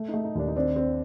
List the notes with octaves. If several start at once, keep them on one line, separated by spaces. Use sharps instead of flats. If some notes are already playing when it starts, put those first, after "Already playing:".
Already playing: A3
D#4
A3
D#4
D#2 D4
D#4
C4 D4
C4